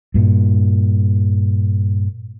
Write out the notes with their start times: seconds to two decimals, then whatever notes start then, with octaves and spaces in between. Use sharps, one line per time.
0.14 G2 A#2